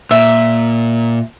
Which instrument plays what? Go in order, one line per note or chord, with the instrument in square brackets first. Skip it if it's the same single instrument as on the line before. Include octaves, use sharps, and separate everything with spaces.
[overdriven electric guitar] A#2 [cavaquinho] E5